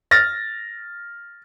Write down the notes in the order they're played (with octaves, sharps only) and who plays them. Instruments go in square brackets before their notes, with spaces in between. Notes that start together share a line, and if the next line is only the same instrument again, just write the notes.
[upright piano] F6 A6 A#6